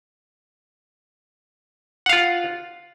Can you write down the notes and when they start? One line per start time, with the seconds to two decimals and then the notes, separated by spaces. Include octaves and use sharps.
2.06 F#5
2.09 F5
2.13 F4